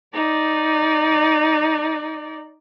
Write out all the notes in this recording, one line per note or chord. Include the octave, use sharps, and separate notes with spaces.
D#4 D5